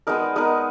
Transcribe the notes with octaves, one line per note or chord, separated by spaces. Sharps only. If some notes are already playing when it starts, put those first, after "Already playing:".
G#3 B3 D#4 A#4
G#3 B3 D#4 A#4